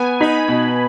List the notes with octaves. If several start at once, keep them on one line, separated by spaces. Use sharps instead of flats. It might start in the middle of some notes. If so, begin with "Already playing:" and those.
Already playing: B3 B4 G#5
D#4 B5
B2